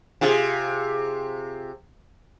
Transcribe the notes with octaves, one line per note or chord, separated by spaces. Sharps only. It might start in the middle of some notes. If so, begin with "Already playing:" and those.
C3 F4 G#4